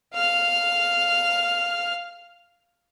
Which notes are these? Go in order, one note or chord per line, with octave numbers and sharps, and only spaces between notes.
F5 F6